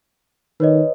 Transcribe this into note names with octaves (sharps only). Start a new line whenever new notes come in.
D#3 B4 C#5 D#5